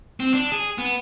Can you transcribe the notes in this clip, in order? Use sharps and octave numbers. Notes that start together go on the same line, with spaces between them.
C4
D4
G#4
B3